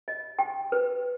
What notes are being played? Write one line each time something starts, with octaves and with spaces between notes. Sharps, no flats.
D#5
G5
B4